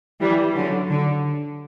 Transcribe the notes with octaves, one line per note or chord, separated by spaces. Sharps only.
E3 G3
D3 F#3
D3